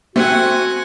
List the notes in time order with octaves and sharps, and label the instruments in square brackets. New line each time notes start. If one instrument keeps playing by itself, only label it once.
[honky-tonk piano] A3 [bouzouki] C4 [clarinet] F#4 [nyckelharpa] F#5 G#5